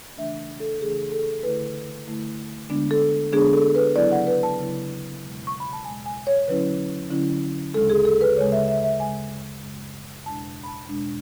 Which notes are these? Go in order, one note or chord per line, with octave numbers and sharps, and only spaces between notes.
C#3 E3 A3 D4 E5
A4
C#3 E3 A3 D4 G#4
A4
D3 A3 E4 B4
D3 A3 E4
D3 G#3 B3 D4
A4
D3 G#3 B3 D4 G#4
A4
B4
C#3 F#3 B3 E4 D5
F#5
B4
A5
C#3 F#3 B3 E4
E2 B2 G#3
C#6
B5
A5
E2 B2 G#3 G#5
G#5
C#5
D3 F#3 C#4 E4 B4
D3 F#3 C#4 E4
D2 C#3 G#3 A4
G#4
A4
B4
D2 C#3 G#3 C#5
E5
E5
E5
F#2 C#3 G#3 G#5
F#2 C#3 G#3
E2 B2 G#3 D4 A5
B5
A5
E2 B2 G#3 D4